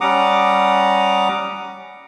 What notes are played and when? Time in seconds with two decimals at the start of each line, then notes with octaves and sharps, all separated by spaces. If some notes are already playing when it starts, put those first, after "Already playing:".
0.01 G3 C#4 F#5 A#5 D6 D#6